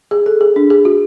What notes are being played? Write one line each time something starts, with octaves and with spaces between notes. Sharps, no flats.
G#4
A4
G#4
D4
G#4
F#4